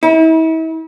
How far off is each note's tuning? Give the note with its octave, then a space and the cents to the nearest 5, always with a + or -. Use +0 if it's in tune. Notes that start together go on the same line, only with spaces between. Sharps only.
E4 -40